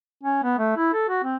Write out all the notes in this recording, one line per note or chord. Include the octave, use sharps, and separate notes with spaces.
C#4
B3
A3
E4
A4
F#4
C4